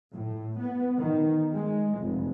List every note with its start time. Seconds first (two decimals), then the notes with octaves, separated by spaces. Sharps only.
0.13 A2
0.59 B3
0.98 D#3
1.53 G#3
2.01 F1